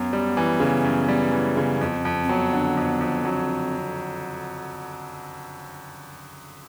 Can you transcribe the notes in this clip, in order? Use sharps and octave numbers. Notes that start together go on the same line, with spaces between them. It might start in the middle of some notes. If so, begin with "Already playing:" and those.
Already playing: F#2 B3
G3
E3
C#3
F#2
G3
E3
C#3
F2 B3
C4
F2
C4
F#3 B3
D3
F2
F2
F#3 C4